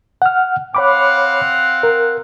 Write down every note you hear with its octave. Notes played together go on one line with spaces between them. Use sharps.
F#5 F6
C4 C#5 F5 F#5 B5 D6
A#4